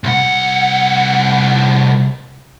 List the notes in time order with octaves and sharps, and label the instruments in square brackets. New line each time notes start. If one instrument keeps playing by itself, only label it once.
[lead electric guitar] C2 F#5